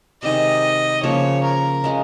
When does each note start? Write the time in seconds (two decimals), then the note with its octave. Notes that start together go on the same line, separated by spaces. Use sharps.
0.23 C3 D#3 G#3 D#5
1.03 C#3 F3 A#3 C#5
1.44 A#4
1.84 C#3 G#3 C#4